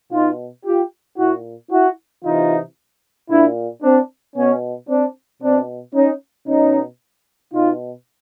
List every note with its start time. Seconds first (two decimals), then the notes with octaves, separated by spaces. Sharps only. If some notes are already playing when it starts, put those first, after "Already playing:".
0.12 B2 D#4 F4
0.65 F4 G4
1.18 A#2 E4 F#4
1.72 E4 F#4
2.24 C3 E3 D#4 F4
3.30 A#2 D4 E4
3.83 C4 D4
4.36 B2 B3 C#4
4.89 C4 D4
5.42 B2 C4 D4
5.95 C#4 D#4
6.48 B2 C#4 D#4
7.54 B2 D#4 F4